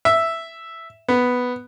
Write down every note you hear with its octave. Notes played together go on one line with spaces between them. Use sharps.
E5
B3